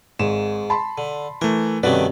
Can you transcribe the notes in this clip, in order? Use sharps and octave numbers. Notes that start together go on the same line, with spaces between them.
G#1 G#2 E7
A5 B5 C6
D3
E3 A3 A#4
G2 C3 D#3 A3 C#4 F#4 B4 D5